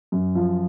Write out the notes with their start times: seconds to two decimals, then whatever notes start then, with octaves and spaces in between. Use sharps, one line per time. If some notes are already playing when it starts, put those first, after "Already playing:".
0.12 F#2
0.35 F3